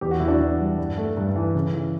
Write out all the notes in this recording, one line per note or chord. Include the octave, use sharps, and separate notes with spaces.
E2 G4
F#4
E2 E4
D4 F#4
E2
G3
G2
A3
G2
E3
C#3
E3